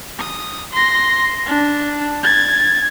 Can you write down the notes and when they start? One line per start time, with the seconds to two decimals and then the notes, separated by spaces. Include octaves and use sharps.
0.19 D#6
0.73 C6 A#6
1.46 D4
2.23 G#6 A6